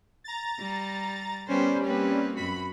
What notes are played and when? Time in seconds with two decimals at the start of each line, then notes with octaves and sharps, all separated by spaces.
0.24 A#5 A6
0.60 G3
1.48 G3 B3 C#4 B4 C5
1.84 A#3 C4 B4
2.36 F#2 F#4 B5